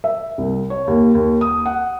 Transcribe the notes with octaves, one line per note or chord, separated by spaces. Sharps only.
E5
C2
C#5
D#2
D#2
D#6
F#5